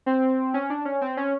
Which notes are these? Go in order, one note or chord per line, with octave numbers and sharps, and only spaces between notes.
C4
C#4
D4
C#4
C4
C#4